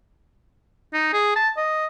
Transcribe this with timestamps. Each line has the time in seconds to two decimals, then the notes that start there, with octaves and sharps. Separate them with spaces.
0.93 D#4
1.13 G#4
1.36 A5
1.57 D#5